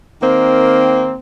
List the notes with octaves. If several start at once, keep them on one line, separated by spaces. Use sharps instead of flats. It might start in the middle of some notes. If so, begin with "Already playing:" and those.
D#3 A#3 C4